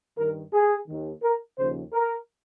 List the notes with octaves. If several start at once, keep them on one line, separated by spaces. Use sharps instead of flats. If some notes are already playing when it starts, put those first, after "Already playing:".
G2 D#3 A#4
G#4
D#2 D#3
A#4
D#2 C#3 F3 C5
A#4